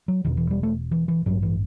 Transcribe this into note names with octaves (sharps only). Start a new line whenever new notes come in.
F#3
E1 E2 B2 D#3
E3
G3
A3
E3
E3
A1 G2 F#3
E3